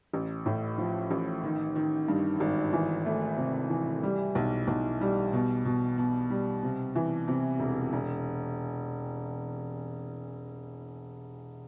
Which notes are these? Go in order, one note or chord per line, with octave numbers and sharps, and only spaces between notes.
A1
A2
F3
A1
D#3
D#3
G2
G#1
E3
A3
C3
E3
G3
B1
B1
G3
B2
B2
B2
G3
C3
E3
C3
E1
E1